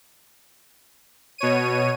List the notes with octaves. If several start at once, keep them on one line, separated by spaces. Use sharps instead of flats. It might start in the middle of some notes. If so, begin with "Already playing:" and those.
B2 C#5 D#7